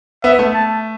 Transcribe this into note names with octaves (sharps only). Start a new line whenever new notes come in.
B3 E5
A3
A5